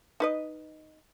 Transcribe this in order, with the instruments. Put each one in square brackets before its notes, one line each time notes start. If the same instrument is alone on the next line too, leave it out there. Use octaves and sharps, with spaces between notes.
[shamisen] D#4 B4 D#5